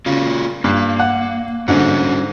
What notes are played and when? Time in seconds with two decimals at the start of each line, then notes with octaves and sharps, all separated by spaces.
0.06 C#3 A#3 F4 F#4
0.64 G2 A#3
1.00 F#5
1.68 G#2 D3 G3 C#4 F#4